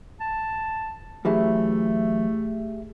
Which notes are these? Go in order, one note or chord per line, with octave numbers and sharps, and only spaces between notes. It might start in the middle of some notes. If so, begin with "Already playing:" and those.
A5
F#2 E3 F#3 A3 G4 G#4 E5